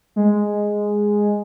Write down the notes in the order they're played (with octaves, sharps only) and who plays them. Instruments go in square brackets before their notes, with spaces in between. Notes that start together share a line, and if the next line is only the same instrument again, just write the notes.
[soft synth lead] G#3